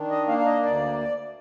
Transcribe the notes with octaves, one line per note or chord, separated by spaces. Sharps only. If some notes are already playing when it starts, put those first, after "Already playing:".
Already playing: D#3 D4
D#5
A#3 F5
F5
D#5
D2 D5